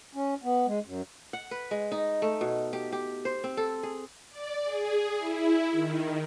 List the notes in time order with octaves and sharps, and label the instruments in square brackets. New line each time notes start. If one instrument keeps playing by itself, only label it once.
[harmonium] C#4
B3
G#3
F#2
[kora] F#5
B4
G#3
D#4
A3
B2
G4
G4
C5
C4
A4
G#4
[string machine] D5
G#4
E4
D#3